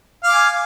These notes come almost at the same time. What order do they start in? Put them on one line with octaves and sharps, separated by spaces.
F5 D6 G#5